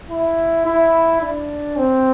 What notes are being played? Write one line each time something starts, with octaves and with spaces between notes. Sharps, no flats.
E4
E4
D4
C4